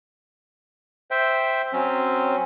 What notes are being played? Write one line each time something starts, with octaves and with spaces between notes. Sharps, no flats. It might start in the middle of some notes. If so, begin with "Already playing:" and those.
C5 E5 G5
F#3 C4 C#4